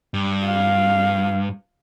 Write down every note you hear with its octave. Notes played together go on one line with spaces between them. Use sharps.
G2
F5